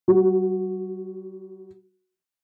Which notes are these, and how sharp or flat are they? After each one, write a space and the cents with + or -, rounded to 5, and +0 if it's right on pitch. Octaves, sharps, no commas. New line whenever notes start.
G3 -45 F#4 +0